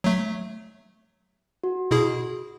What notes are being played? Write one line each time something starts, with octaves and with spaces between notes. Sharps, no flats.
F#3 A3
F#4
B2 E4 G#4